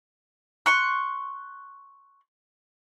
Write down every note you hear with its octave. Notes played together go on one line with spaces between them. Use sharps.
C6 C#6 F#6